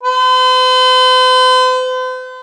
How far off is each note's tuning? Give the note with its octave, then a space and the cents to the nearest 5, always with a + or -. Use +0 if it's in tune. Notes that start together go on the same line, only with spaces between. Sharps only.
C5 -45